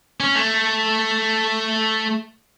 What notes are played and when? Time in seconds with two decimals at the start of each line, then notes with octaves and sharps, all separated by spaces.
0.20 C#4
0.35 A3